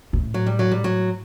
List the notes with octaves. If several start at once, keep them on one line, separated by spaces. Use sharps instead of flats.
A2
F#3
G3
F#3
G3
F#3